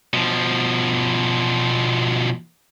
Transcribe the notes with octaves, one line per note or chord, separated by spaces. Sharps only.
B2 F3